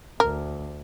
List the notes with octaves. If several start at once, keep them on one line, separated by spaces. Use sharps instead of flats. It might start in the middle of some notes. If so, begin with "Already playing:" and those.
D2 A#4